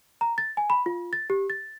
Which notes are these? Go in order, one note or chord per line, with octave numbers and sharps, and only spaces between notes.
A#5
A6
G#5
B5
F4
A6
G4
A6